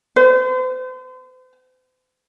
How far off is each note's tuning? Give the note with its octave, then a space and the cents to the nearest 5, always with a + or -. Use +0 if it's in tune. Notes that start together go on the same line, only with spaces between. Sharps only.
C5 -40